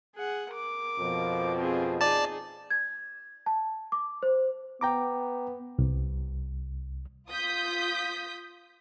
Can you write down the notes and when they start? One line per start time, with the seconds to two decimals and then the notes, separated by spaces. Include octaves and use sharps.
0.16 G#4 F#5
0.50 A#4 D6
0.99 F2 B2 F3
1.58 C4 G#4
2.01 D#4 G#4 D5 A5
2.70 G#6
3.46 A5
3.92 D6
4.23 C5
4.81 B3 G5 A#5 D6
5.79 C2
7.29 F4 D#6 G6 B6